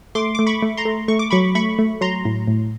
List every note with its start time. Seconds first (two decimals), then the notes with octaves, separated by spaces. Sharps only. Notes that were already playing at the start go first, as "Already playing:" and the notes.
0.15 A3 C6 D6
0.35 A3 D6
0.47 B5 C#6
0.62 A3
0.77 A#5 C6
0.85 A3
1.08 A3 C#6
1.19 D6
1.31 F#3 B5 C#6
1.55 A3 B5 C#6
1.79 A3
2.01 F#3 A#5 C6
2.25 A2
2.48 A2